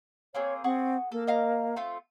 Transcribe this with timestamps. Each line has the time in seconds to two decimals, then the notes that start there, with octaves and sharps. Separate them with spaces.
0.35 A#3 C4 G#4 C#5
0.64 C4 G#4 F#5 C#6
1.12 A#3 A4
1.27 D#5 F5 A#5
1.76 A3 C4 F4